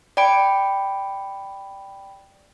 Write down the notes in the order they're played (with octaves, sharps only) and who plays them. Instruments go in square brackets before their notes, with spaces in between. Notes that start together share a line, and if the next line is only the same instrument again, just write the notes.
[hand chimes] D5 G5 B5 D7